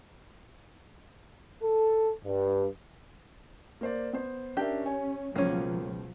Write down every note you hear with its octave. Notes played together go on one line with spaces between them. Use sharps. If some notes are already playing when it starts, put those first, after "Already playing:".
A4
G2
A#3 C5 D5
B3 C5
C#4 D4 G4 A#4 E5
C#5 G#5
C#2 B2 F3 F#3 A#3 C#4